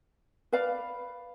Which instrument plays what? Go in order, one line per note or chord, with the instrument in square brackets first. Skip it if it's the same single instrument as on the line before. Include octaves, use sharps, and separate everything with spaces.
[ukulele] B4 D5 F5 B5